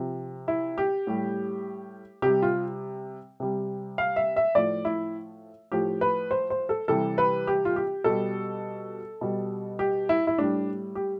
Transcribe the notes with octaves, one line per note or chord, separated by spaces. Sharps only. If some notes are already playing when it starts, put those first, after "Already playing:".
Already playing: C3 F3
E4
G4
A2 G3
C3 G3 G4
F4
C3 G3
F5
E5
E5
A2 F3 D5
E4
A2 F3 G4
B4
C5
C5
A4
C3 E3 G3 A4
B4
G4
F4
G4
B2 G3 A4
B2 G3
G4
E4
E4
A2 G3 D4
G4